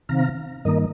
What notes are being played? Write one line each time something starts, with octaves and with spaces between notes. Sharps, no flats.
C3 D#3 C4 F5 A#5
G2 D#3 A#3 A#4 D#5